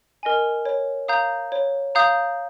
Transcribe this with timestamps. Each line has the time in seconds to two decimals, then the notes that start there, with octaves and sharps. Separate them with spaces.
0.23 A#4 D#5 G#5
0.65 C#5
1.08 F5 A#5 D#6 G6
1.52 C#5
1.95 F5 A#5 D#6 G6